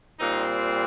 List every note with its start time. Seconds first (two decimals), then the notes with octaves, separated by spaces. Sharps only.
0.20 A#2 G3 C4 D#4